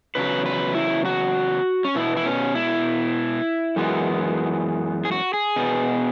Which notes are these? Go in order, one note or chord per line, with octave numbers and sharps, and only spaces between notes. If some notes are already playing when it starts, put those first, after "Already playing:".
E2 C#3 F#3 B4
B4
E4
F#4
C#4
B2 B3 E4
E4
C#4
E4
F#2 E3 G#3 B3
G#4
F#4
G#4
B2 B3